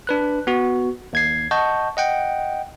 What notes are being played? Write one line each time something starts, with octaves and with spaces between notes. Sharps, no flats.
D4 B4 F#6
B3 F#4
D#2 G#6 C7
D#5 F#5 A5 C#6 G6
D#5 F#5 G5